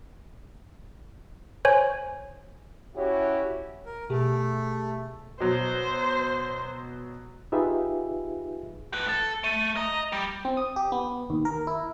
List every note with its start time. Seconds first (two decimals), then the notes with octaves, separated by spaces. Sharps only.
1.65 C5 C#5 G#5
2.95 C#4 E4 F#4 G4 C#5
3.86 A#4
4.10 B2 A3 G4 G#4
5.40 B2 F#3 C5
7.52 D#4 F4 G4 G#4 B4 E5
8.94 A2 B4
9.09 A4
9.44 A3 D#7
9.77 D#5 A#5
10.13 G3
10.45 C4
10.57 D#6
10.76 G4
10.92 B3
11.30 D#2
11.45 A#4
11.67 E4